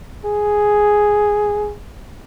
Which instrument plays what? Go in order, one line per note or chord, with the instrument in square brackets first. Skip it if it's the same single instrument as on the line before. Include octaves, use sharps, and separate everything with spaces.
[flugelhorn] G#4